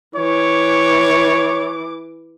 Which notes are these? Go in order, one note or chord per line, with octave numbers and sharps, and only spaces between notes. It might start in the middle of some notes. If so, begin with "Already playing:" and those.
E3 C#5 D6